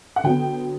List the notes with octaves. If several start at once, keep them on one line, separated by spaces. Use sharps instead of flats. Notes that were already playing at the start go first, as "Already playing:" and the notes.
F#5
D3 F#3 B3 G5